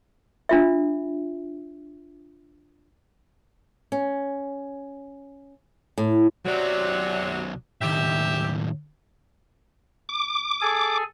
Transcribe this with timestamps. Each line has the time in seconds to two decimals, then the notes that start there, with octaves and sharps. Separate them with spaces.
0.49 D4 F4 E5
3.92 C#4
5.98 A2
6.46 B1 C3 F#3 D5
7.81 D#2 A2 G4 E5
10.09 D6
10.61 G#4 A4 G#5